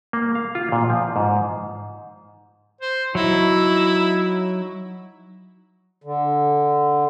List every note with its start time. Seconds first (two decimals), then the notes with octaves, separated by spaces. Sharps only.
0.13 A#3
0.35 F5
0.55 F4
0.72 A#2
0.90 F3
1.16 G#2
2.81 C5
3.15 F#3 D#4 E4
6.04 D3